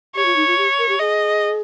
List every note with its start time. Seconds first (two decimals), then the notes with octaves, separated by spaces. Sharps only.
0.16 G4 C#5
0.25 F4
0.36 D#4
0.48 F4
0.58 G4
0.79 A#4
0.89 G4
0.99 G#4 D#5